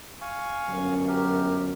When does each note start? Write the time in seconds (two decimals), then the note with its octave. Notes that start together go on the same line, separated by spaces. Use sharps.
0.21 F5 G#5 C#6
0.68 G1 F#2
1.08 G4 A#4